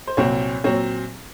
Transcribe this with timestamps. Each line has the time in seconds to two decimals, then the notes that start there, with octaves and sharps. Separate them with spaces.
0.07 C5
0.17 C2 A#2 F#3 C4 C#5
0.64 A#2 F#3 C4 C#5